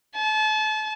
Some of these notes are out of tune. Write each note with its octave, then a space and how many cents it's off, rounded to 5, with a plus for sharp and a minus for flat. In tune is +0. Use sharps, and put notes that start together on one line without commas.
A5 -35